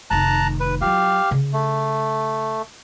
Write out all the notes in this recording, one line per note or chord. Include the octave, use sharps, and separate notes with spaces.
F1 D#3 A5 A#5 F#6
B4
F#3 F4 G4 F5
C#3
A3